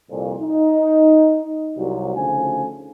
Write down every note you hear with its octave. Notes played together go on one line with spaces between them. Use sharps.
C2 F2 A#2
D#4
C2 F#3
D2 C#3 F3 D#4 A4 G#5